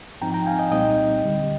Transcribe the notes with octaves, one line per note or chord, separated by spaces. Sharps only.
G#2 F3 C4 D#4 G5 A#5
G5 A#5
F5 G#5
D#5 G5
C2 A#2 G3 C4 D#4 D#5 G5
D2 D3 G3